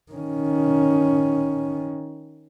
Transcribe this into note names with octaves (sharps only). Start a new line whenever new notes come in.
D#3 C#4